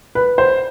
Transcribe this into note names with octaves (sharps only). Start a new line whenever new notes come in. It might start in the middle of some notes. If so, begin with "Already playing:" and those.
B4
C5